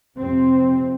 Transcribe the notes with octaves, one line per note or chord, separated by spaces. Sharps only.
F2 C3 C4